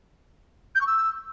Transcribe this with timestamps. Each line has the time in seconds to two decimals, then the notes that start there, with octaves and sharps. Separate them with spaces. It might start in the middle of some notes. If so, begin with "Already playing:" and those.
0.75 G6
0.81 C#6
0.87 E6